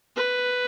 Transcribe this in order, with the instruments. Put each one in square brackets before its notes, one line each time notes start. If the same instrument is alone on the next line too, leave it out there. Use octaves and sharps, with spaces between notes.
[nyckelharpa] B4